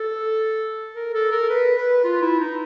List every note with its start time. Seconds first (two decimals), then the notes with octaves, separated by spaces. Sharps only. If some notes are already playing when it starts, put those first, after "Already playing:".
Already playing: A4
0.96 A#4
1.14 A4
1.32 A#4
1.49 B4
1.77 B4
2.04 F4
2.22 E4
2.40 D#4